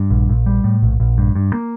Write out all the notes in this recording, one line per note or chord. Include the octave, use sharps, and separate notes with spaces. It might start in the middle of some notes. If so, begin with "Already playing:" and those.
Already playing: G2
A#1
A#1
G3
A2
A#1
A#1
G2
G2
A#3